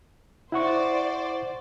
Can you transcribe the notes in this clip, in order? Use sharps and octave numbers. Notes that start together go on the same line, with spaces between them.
E4 C5 D5 F#5 C#6